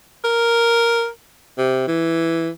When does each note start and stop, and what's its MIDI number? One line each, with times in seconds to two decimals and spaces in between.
0.24 1.07 70
1.58 1.86 48
1.87 2.49 52